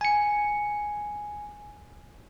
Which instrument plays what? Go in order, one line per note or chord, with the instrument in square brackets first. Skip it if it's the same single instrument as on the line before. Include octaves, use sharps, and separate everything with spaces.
[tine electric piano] G#5 C#7